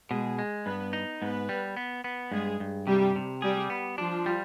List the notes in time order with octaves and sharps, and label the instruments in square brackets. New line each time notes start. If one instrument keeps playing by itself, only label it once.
[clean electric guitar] B2 [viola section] G#3 G#4
[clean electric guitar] G#3
[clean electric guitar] G2 [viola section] B3 B4
[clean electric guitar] D#4
[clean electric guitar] G#2 [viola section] B3 B4
[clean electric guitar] G3
B3
B3
[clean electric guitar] G2 [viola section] G#3 G#4
[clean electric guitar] G2
[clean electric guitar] C3 [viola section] G3 G4
[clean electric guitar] C3
[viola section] G3 G4 [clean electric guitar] G#4
[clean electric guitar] B3
[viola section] F3 F4 [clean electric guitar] D4
[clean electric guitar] G3